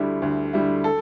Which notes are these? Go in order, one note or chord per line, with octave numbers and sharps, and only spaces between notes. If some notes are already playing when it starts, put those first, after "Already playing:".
Already playing: D2 D3 G3 E4
D2
D3 G3 E4
A4